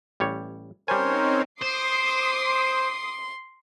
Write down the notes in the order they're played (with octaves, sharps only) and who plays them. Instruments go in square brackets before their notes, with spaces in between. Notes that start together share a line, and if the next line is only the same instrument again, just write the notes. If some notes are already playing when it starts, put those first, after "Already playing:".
[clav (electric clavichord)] A1 G3 C#5
[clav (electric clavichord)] G3 G#5 [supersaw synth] C4 C#4 D#4 [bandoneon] A#4 C5 C#5
[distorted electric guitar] C5 [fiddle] C6 [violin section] D6 D#6 C7